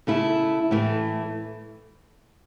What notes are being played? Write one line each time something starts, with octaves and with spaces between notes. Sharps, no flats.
C#3 A3 E4
A2 E3 A3